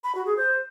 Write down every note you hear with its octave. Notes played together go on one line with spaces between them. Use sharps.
B5
F#4
G#4
C5